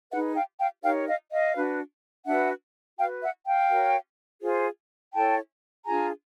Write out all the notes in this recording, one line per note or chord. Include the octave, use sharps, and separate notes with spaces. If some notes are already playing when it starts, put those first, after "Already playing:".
D#4 G#4 B4 E5 F#5
F5 G5
F5 G5
D#4 G4 A#4 C#5 F5 G5
D#5 F5
D#5 F5
D4 F#4 B4
D4 F#4 B4 E5 F#5
F#4 B4 F5 G5
E5 F#5
F5 G5
F#4 A#4 C#5
F4 G#4 C5
E4 A4 C#5 G5 A5
D4 F4 G#4 G#5 A#5